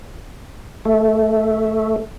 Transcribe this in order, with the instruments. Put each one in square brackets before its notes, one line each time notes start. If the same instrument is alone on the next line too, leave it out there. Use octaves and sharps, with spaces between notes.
[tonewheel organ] A3